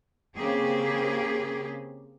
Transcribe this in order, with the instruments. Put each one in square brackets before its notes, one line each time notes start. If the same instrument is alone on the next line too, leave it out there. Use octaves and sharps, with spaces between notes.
[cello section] C#3 A#3 C4 G4 G#4